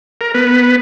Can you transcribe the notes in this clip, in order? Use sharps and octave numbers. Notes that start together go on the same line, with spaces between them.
A#4
B3 B4